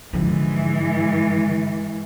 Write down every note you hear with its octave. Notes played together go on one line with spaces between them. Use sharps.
G#2 D3 E3 F3